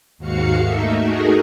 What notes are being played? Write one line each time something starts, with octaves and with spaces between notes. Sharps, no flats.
D#2 G#2 F#4 F5 C#7
A3 A#3 D#4 E5
A3 D#4 F#4 G#4 A#4